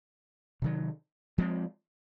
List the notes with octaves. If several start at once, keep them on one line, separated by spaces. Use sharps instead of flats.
C3 D#3 F#3
F3 G#3 C4